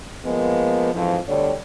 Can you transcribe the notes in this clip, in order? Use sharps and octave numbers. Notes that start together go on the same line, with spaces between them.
F3 G#3 A#3 B3
F2 G#2 E3 F3
D2 B2 D3 G3 C#5